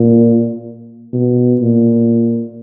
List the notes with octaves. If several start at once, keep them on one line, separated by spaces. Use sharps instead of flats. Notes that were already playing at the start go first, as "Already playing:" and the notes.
Already playing: A#2
B2
A#2